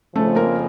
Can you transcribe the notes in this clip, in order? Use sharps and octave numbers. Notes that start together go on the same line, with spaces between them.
F2 C#3 F3 A3 A4
A#3 A#4